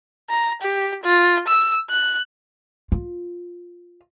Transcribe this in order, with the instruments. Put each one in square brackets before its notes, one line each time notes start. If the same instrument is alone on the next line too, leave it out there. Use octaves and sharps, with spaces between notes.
[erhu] A#5
G4
F4
E6
F#6
[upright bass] F4